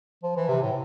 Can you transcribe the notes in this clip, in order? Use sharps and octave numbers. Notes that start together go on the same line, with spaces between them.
F3
E3
C3
A2